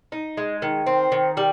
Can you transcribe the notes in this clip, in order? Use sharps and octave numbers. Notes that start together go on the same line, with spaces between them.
D#4
G#3
D#3
C4
D#3
G3